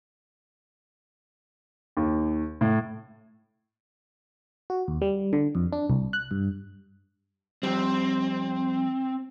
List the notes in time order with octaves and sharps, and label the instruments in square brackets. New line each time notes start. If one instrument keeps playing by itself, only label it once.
[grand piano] D#2
A2
[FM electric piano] F#4
D#2
G3
D3
F2
D4
C2
F#6
G2
[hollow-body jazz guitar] F2 G3 [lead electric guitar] C4